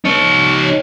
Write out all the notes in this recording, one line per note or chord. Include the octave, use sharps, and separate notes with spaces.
D#4 C#5